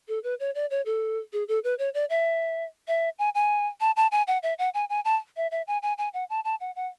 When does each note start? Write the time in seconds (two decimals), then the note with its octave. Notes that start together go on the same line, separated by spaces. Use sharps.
0.08 A4
0.24 B4
0.40 C#5
0.55 D5
0.71 C#5
0.86 A4
1.33 G#4
1.48 A4
1.64 B4
1.79 C#5
1.94 D5
2.10 E5
2.88 E5
3.19 G#5
3.35 G#5
3.80 A5
3.96 A5
4.12 G#5
4.27 F#5
4.43 E5
4.59 F#5
4.74 G#5
4.90 G#5
5.05 A5
5.37 E5
5.51 E5
5.67 G#5
5.83 G#5
5.98 G#5
6.14 F#5
6.30 A5
6.44 A5
6.60 F#5
6.76 F#5